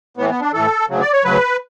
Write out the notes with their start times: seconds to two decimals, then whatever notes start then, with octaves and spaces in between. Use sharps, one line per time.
0.17 A2 B3
0.21 E3
0.30 B3
0.41 D4
0.53 A2 E3 A4
0.89 D2 C#3 F#3
1.01 D5
1.13 C#5
1.24 D2 C#3 F#3 B4